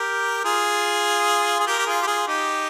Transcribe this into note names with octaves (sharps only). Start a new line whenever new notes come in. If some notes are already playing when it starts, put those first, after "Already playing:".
Already playing: G4 A#4
F4 G#4
G#4
G4 A#4
G4
F4 G#4
G4
F4 G#4
D#4 G4